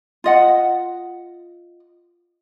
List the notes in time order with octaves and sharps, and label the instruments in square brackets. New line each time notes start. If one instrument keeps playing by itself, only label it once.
[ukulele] F4 D#5 F#5